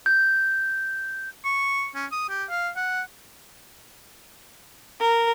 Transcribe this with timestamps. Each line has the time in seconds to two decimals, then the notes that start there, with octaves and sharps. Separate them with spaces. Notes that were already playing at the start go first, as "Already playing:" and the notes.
0.06 G6
1.45 C#6
1.95 C#4
2.12 D#6
2.29 G4
2.50 F5
2.76 F#5
5.00 A#4